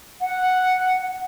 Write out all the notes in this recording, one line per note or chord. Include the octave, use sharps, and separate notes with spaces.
F#5